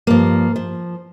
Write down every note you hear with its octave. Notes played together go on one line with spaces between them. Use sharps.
G2 F3 A#3
F3